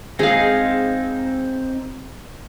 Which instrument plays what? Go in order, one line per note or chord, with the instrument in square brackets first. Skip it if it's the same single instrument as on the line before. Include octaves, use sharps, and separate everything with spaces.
[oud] G#3 [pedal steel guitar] C4 D#4 [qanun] G#4 F5